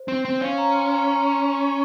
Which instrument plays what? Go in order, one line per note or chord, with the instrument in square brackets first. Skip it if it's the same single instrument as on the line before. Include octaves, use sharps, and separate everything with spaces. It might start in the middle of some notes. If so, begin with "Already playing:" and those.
Already playing: [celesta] C5
[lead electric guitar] C4
C4
[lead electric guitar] C#4 [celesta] F5
[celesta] A#5
C6
A#5
A#5
C6
A#5